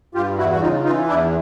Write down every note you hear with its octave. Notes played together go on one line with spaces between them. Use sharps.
G2 F4 G4
E2 E4 F#4
F#4
C#3 D#4 F4
E3 D#4 F4
E2 D4 E4